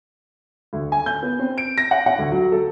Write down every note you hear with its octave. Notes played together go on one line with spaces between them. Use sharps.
D2
G#5
G6
B3
C4
D7
A#6
F#5
F#5
D2
F#3
A4